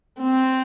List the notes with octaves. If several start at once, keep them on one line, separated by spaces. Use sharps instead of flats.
C4